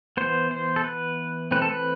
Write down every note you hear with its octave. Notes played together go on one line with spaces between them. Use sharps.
E3 B3 C5
C5
A4
B4
E3 A3 C4 B4
A4
B4